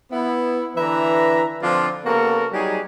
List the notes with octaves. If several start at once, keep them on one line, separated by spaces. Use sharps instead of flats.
B3 E4
D3 E3 B4 E5 A#5
D3 F3 C4 D4 F4
C#3 A#3 B3 F#4 A4 A#4
F#3 G3 D#4 G4 G#4